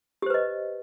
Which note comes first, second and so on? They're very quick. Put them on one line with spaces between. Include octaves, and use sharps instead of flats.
G4 C5 B4 D#5